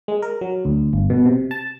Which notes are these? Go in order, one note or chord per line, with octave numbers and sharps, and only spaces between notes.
G#3
A#4
F#3
D2
G1
B2
C3
A5